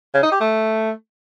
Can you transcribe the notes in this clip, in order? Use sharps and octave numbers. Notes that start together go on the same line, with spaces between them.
C#3
D#4
G4
A3